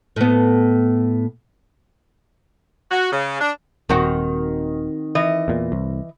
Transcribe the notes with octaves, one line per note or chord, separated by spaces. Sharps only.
A2 B3
F#4
C#3
D4
D#1 D#3 C4 F#4
E3 D#5
E2 A#2
C2